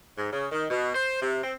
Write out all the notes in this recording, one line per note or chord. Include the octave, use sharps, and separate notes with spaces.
G#2
C#3
D#3
B2
C5
C3
C4